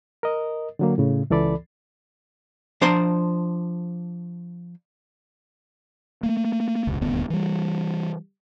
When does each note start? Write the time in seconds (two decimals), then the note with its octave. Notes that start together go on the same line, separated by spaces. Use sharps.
0.23 A#4 D#5
0.79 D3 F#3 A#3
0.98 A2 C#3
1.30 C#2 E3 A4 D5 B5
2.81 F3 D4 C5 A#5 C6
6.23 A3 A#3
6.87 F1 C#2
7.01 D#1 D2 G2 B3
7.30 E3 G3